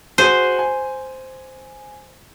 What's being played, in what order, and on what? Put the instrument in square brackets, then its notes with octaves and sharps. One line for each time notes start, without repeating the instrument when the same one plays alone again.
[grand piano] F#4 G#4 D#7 [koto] C5
[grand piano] G#5